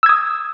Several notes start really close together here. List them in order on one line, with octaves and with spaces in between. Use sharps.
E6 G#6 D#6